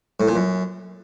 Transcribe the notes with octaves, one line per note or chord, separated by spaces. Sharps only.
A2
A#2
F#2